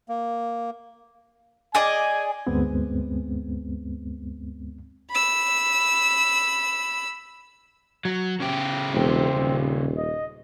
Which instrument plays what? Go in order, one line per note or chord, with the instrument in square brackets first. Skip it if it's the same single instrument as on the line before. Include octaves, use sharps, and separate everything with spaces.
[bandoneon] A#3
[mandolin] G#4 D5 D#5 [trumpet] G#5
[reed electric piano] D2 G2 G#3 B3 C4
[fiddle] B5 E6
[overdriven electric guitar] F#3
C#3 G4
[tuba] E1 [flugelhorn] C4
[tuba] D#1
[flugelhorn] D#5